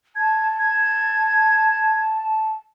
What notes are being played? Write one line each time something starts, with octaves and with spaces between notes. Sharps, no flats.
A5 G#6
G#6